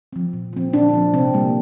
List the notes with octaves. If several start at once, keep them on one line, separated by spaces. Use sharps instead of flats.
F3 C4
A#2
F3 C4
A#2 D4
F3 C4
C3 C4
G3 A#3